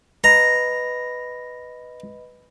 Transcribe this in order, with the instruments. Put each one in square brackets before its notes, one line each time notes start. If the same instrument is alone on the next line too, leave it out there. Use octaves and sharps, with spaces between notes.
[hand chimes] B4 D#5 B5 [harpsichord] A#5